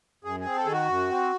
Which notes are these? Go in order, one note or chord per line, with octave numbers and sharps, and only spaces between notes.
F#2 G#4
G#4
C4
A4
D#3 G#4
F#4
F#2
C4